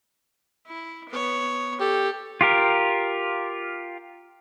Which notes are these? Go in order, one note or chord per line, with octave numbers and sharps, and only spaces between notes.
E4
B3 C#5
G4 A4
F4 G4 A#4